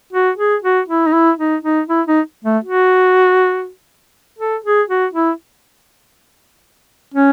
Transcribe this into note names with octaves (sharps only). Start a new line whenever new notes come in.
F#4
G#4
F#4
E4
D#4
E4
D#4
D#4
E4
D#4
A3
F#4
A4
G#4
F#4
E4
C#4